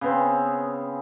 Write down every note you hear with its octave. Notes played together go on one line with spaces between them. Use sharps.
C#3 B3 C4